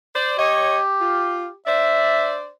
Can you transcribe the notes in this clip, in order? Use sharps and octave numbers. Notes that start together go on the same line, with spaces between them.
C5 D5
G4 C#5 D#5
F4
D4 C5 D5 E5